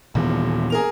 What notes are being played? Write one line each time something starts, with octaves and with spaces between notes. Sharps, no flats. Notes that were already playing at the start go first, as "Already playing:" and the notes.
D#1 A#2 E3 B3
G#4 A#4 F7